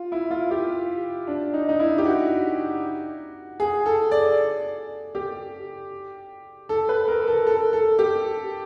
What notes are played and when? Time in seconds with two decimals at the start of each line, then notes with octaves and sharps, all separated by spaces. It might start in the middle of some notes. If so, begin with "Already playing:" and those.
Already playing: F4
0.12 E4
0.30 F4
0.51 G4
1.27 D4
1.54 D#4
1.69 D#4
1.79 E4
1.98 G4
2.06 F#4
3.60 G#4
3.86 A4
4.11 D5
5.15 G4
6.69 A4
6.89 B4
7.08 A#4
7.28 A4
7.47 A4
7.73 A4
7.99 G4